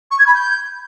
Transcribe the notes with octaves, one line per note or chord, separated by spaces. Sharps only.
C#6
G#6
B5
G6